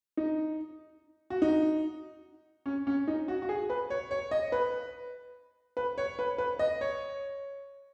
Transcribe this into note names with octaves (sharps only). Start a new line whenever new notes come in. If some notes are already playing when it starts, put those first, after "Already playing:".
D#4
F#4
D#4
C#4
C#4
D#4
F#4
F#4
G#4
B4
C#5
C#5
D#5
B4
B4
C#5
B4
B4
D#5
C#5